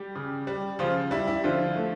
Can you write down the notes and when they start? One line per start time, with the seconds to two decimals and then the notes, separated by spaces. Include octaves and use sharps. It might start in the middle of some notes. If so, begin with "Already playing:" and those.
Already playing: G3 G4
0.15 C#3
0.47 G3
0.79 C#3 F3 F4
1.11 G3 E4
1.27 E4
1.44 D3 F3 F4
1.76 A3